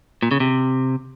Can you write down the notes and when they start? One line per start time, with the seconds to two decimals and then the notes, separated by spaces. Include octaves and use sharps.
0.23 A#2
0.31 C#3
0.40 C3